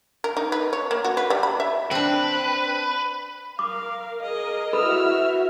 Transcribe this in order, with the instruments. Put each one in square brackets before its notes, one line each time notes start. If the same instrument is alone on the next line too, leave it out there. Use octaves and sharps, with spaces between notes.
[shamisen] A#4
D#4
B4
C#5
A#3
F#4
B4
G3
B5
E5
[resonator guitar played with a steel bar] C4 D4 [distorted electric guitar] B4
[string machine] A#4 [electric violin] F5 [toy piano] D6
[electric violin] G#4 D#5 [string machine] A#4
[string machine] E4 F#4 E5 [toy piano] A4 B4 B5 [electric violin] E6 F6